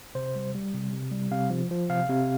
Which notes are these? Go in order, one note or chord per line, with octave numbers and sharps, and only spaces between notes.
C3 C5
G3
G3
C3
C3
G3
C3 F5
F3
F3
C3 F5
C3